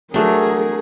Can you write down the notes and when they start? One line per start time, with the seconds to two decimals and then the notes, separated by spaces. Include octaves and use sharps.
0.14 F#3 A3 D4 G#4 A#4